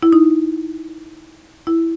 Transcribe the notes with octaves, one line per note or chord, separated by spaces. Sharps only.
E4
D#4
E4